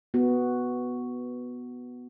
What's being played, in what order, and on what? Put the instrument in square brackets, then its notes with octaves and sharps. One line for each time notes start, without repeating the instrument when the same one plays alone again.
[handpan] B3 F#4